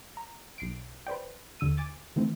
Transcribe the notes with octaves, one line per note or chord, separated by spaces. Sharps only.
A#5
B1 C7 D7
B4 C5 D5 G5
D#2 D3 E6 D#7
G#5 D6 A6
D#3 E3 A3 C4